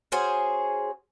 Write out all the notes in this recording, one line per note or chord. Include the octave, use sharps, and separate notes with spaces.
C#4 F#4 G#4 C5